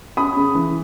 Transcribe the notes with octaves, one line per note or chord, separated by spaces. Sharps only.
C#4 B5 D#6
C#3
E3